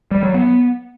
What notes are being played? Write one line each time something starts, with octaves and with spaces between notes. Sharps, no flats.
G3
F#3
B3